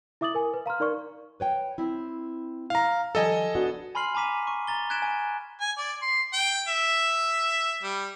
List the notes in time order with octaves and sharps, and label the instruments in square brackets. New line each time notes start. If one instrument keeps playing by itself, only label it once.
[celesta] E4 E5 D6 D#6 A6 F#7
A#4 G#5
B4
F5 A#5 C6 F6
D#4 A#4 D5 C6 C#6
[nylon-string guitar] B4 C#5 G5
C4 E4
[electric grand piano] F5 A#5
[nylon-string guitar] D#3 F3 G3 [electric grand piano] A4 D#5 G#5
[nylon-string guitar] B3 D4 F#4
[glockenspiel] G#5 B5 C6 F6 C7 F#7
G#5 A#5 D6 B6 D#7
C#6
A#5 A6 G7
F#6 G#6 B6 D7 E7
G#5
[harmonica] G#5
D5
C6
G5
E5
G3